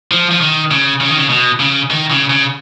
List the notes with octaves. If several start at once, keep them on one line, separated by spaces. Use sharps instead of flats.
F3
F3
D#3
C#3
C#3
D#3
C#3
B2
C#3
D#3
C#3
C#3